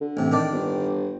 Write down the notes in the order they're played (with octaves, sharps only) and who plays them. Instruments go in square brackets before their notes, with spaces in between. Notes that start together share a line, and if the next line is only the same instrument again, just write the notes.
[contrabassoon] D3
[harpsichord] A1 C3
D#3 D4 D5
[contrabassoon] G1